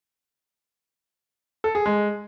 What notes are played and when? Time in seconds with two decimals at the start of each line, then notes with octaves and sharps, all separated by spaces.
1.64 A4
1.75 G#4
1.86 G#3